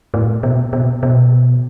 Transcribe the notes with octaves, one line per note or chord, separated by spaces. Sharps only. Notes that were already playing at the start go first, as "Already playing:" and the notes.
A2
B2
B2
B2